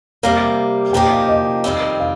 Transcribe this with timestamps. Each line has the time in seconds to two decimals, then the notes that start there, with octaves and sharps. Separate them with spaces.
0.23 C3 G3 A#3 F5
0.93 A#2 F3 A#3 D#4 G4 G5
1.11 F5
1.28 D#5
1.64 F2 D#3 G3 C4
2.00 F5